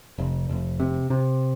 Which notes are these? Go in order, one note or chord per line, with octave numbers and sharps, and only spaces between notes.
F1
F1
C3
C3